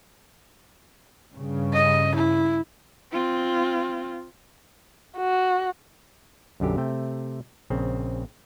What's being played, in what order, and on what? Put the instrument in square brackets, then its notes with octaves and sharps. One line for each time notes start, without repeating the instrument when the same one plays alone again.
[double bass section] G2 C#3
[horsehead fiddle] D#5
E4
C4 F4
[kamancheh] F#4
[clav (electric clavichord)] B1 F#2 D3 G4
C3 A3 E5 G5
A#1 C#3 C4